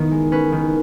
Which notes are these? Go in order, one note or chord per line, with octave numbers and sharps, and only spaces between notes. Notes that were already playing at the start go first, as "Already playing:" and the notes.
Already playing: D#3 B3 E4 C#5
G#3
C#4 B4
D#3